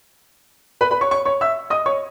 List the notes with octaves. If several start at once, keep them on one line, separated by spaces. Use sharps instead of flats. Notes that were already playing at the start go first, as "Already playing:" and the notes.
B4 B5
B4 B5
C#5 C#6
C#5 C#6
C#5 C#6
E5 E6
D#5 D#6
C#5 C#6